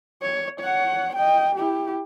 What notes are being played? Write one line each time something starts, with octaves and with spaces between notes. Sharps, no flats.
C#5
C#5 F#5
D#5 G5
E4 G4